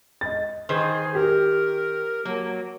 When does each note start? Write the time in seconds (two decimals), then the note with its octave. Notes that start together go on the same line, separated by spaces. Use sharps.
0.21 D#5 A6
0.69 D#3 G#4 B4 C5
1.15 G4 A#4
2.25 F#3 A#3